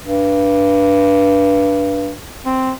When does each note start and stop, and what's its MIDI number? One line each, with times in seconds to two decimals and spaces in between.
0.04 2.12 43
2.45 2.71 60